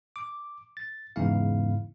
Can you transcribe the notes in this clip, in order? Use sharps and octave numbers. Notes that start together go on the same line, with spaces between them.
D6
A6
E2 G#2 C#3 E4 F5